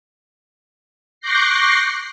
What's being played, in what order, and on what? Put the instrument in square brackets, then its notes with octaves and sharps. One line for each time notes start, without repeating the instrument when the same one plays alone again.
[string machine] C#6 D6 F#6 G6 A#6 C7